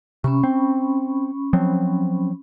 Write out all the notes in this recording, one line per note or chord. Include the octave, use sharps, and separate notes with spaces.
C3 C#4 B5 C#6
C4
F3 F#3 C4